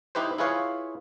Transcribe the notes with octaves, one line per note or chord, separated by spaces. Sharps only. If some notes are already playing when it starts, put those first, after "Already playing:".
D#4 E4 G4 B4 C5
E4 F4 G#4 B4 C#5 F5